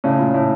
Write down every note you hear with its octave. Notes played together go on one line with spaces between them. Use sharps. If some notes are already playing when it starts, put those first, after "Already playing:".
A2 C#3
A#2
A2